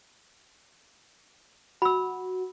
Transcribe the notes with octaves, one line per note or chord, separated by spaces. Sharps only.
F#4 B5 E6